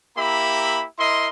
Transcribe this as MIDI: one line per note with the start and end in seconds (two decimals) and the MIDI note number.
0.17 0.86 58
0.17 0.86 64
0.17 0.86 67
0.17 0.86 76
0.17 0.86 82
0.17 0.86 83
0.99 1.28 64
0.99 1.28 70
0.99 1.28 75
0.99 1.28 84